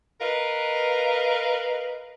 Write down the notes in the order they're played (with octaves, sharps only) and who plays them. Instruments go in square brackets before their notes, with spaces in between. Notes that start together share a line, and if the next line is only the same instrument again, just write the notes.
[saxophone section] A#4 B4 D#5 F5